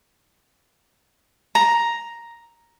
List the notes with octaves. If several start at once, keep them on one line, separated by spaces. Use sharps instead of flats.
A#5